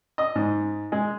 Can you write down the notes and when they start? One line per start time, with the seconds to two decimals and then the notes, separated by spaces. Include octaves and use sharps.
0.18 D#5
0.35 G#2
0.92 G#3